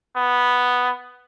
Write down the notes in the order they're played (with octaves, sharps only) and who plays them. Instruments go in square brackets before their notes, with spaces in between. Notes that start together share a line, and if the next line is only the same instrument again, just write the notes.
[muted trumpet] B3